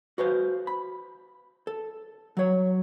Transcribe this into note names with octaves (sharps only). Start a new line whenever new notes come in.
F#4 B4 C5 F5
B5
A4
F#3 C#5